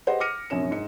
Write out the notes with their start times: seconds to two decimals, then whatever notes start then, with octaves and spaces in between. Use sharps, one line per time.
0.07 G4 G#4 B4 C5 D#5 F#5
0.20 D6 F6 A#6 C#7 D#7
0.50 A#1 F#2 C3 C#5 E7
0.71 G#2 C#7